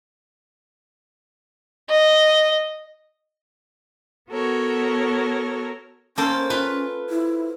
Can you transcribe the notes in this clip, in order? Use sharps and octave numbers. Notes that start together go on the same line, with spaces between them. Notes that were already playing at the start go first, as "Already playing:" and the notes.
D#5
B3 F#4 A4 A#4 C#5
A#3 C#4 A4 C5
F4 B4
E4